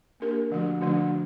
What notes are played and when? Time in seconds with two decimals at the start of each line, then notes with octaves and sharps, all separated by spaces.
0.20 A#3 D4 G4 A#4
0.50 D3 F3 A3 D4 F#4
0.81 D3 F3 A3 D4 F#4